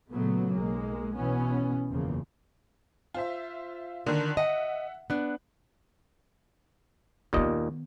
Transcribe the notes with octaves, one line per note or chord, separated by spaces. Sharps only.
A#2 C#3 F#3 A3 B3
B1 G#3 A#3
B2 E3 B3 C#4
F#1 E2 C#3 F3 A#3
F4 C5 E5
D3 D#3 D4 A#4
D#5 E5 F#5
B3 D4 F#6
D#2 A#2 D#3 B3 D#5